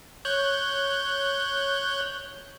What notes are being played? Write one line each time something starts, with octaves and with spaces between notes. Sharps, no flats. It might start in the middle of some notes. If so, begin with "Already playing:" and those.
C#5 F#6 G6